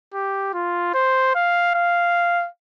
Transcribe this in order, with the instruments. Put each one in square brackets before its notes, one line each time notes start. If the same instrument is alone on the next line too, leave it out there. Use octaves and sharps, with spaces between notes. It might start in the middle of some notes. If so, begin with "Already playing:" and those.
[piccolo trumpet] G4
F4
C5
F5
F5